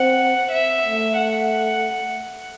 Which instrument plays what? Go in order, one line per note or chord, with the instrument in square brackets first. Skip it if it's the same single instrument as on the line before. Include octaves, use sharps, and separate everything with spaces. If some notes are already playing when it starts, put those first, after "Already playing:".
Already playing: [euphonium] C4 [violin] F#5
[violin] E5
[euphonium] A3
[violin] F#5